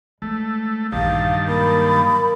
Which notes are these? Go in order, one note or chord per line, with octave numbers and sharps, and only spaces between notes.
G#3 A3
A#1 E2 G2 D#3 F5 A5
F#3 A#3 B5